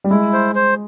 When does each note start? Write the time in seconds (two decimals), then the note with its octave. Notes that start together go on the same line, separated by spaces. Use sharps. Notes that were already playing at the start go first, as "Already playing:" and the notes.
0.04 G3
0.10 G#3 E4
0.33 C5
0.55 C5